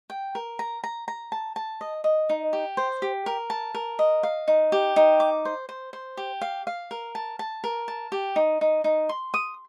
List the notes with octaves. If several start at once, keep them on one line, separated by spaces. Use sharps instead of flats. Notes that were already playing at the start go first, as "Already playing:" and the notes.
G5
A#4
A#5
A#5
A#5
A5
A5
D#5
D#5
D#4
G4
C5
G4
A#4
A5
A#4
D#5
F5
D#4
G4
D#4
D6
C5
C5
C5
G4
F5
F5
A#4
A5
A5
A#4
A5
G4
D#4
D#4
D#4
C6
D#6